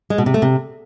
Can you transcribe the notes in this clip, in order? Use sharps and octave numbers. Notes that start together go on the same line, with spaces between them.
G#3
B2
C3
A3
C3